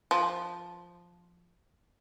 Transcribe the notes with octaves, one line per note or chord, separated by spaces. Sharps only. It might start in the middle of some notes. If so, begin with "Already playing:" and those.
F3